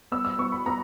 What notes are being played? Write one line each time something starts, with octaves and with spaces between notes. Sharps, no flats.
B3 E6
E6
B3 C#6
B5
B3 A#5